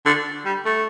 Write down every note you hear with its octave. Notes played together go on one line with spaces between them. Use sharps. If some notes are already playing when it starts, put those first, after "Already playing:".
D3
G3
A3